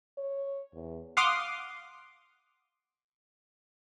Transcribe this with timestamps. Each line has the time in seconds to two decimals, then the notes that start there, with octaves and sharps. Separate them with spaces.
0.18 C#5
0.74 E2
1.17 F5 F#5 C6 D6 D#6